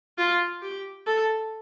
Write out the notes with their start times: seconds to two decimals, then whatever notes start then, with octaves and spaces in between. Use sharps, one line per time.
0.18 F4
0.62 G4
1.07 A4